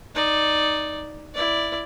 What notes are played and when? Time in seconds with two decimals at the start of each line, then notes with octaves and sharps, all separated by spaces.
0.15 D#4 D5
1.34 E4 D5